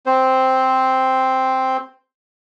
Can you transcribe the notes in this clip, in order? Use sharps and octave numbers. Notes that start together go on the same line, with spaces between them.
C4 C5